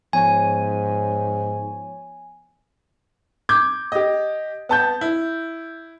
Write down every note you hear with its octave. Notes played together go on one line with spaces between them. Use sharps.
G#2 F3 B3 C#5 G#5
D6 G6 G#6
G4 D#5
B3 A5 G6
E4